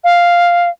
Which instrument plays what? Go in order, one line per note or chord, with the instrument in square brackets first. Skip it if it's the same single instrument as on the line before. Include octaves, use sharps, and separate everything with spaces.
[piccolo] F5